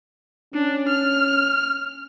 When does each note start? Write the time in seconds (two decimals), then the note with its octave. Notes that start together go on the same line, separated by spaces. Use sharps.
0.54 C#4 D4
0.88 F6